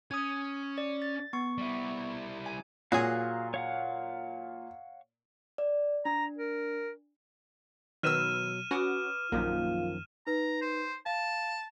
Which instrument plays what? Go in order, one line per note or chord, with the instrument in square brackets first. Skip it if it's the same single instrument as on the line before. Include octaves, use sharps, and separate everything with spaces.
[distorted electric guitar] C#4 [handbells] D#6 G#6
[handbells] D5
A6
B3 C#6
[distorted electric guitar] G3 E4
[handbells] G#5
[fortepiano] A#2 [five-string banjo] F#3 F#4 G#4 [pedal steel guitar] F5 A#5 F#6
[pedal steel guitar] C#5 F5 F#5
[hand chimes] D5
[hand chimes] D4 [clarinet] A#5
[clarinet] A#4
[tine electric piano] B2 F#3 [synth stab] D#3 B4 E6 [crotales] F6 D#7 E7
[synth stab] C#4 F#4 [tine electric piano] B4 D6 D#6
[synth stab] A#1 A#3 [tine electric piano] F#2 D#3 F3 [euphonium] F4
[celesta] D#4 B4 [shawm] A#5
[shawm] C5
[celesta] F5 [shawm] A5